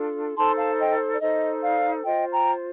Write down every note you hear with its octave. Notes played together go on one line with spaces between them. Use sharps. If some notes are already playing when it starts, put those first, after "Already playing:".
Already playing: D4 F4 A4
D#4 A4 C5 A5 C6
F5 A5
D#5 G5
D5
D#4 A4 C5 D#5
D5 F5
F4 C5 D#5 G5
G5 A#5